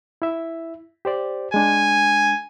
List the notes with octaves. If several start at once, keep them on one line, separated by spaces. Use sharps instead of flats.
E4 E5
G4 C5 D5
G#3 D4 G#5